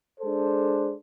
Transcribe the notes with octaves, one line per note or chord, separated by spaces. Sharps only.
G#3 D4 A4 C5